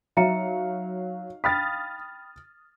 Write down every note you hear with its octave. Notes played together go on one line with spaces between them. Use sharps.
F#3 D#4 E5 F5 A#5 C#7
G5 B5 D#6 F6 A6 B6